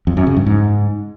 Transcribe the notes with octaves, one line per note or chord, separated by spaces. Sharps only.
F2
F#2
C#3
G2
G#2